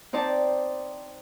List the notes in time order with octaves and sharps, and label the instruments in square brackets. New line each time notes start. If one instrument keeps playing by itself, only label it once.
[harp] C4 D#4 C5 D5 A5